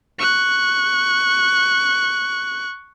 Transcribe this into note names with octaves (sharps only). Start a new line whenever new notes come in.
C#6 F#6